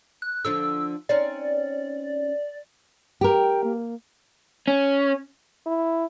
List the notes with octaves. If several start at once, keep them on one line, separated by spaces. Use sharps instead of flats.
F#6
D3 F3 D4 E6
C4 C#4 D#4 D5
G4 A#4 G5
A#3
C#4
E4